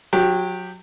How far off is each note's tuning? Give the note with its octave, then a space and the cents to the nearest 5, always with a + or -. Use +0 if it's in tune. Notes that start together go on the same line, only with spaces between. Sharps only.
F#3 -25 G4 +0